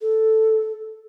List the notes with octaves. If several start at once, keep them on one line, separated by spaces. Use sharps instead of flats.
A4